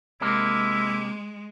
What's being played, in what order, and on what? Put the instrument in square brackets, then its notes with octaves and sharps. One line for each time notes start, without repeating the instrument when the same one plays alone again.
[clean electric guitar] C3 A#3 [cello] G#3 [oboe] E4